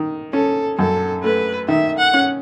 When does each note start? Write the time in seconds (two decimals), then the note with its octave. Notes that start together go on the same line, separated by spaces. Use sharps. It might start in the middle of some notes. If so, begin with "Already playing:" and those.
Already playing: D#3
0.33 C#4 A4
0.78 F#2 A4
1.23 A3 B4
1.68 D#3 E5
1.98 F#5
2.14 C#4